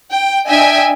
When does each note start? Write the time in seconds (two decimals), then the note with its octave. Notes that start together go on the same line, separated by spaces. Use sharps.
0.12 G5
0.48 D4 D#5 E5 G5 G#5